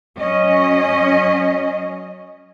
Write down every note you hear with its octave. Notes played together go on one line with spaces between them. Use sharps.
F#3 C#4 D#5